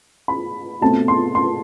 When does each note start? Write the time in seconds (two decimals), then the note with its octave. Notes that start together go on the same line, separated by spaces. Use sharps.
0.28 B5
0.81 B2 A3 C4 A5
1.08 C6
1.35 C6